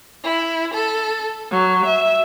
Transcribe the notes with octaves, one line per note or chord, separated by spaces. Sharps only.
E4
A4
F#3
E5